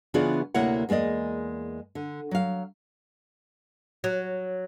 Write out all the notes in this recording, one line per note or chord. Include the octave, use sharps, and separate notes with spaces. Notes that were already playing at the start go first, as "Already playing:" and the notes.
C#3 E3 B3 D4 F4 G#4
D2 C3 A#3 E4 C#5 F#5
E2 G#3 A#3 D5 D#5
D3
F#3 F5
F#3